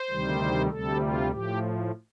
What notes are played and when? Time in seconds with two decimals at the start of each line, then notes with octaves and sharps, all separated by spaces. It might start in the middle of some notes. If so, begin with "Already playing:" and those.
Already playing: C5
0.10 D2 C3 D#3 G3
0.70 D2 C3 G3 A4
1.00 F4
1.31 A2 F3 G4